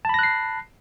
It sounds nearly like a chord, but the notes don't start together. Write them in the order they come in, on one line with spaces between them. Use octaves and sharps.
A5 B5 A#6 F#6 C7